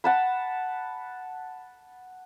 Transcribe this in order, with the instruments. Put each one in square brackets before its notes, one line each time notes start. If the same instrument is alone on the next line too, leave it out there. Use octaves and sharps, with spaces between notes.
[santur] F#5 A5 B5